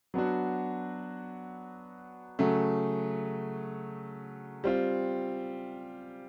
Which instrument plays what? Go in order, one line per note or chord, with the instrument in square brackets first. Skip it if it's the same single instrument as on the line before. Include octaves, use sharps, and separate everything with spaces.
[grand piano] F#3 B3 D4 F#4
C#3 F#3 A3
G3 C4 F4